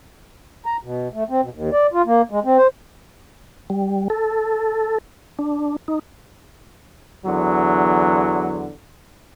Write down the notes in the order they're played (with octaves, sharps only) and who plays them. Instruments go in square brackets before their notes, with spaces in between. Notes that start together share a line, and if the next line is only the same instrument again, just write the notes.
[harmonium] A#5
B2
A3
C4
B2
D#2
D5
F4
A#3
G#3
C4
C5
[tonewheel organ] G3
A4
D4
D#4
[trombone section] E2 D3 F#3